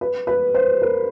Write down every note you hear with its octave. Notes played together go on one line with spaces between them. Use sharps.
B4
B4
C5
A#4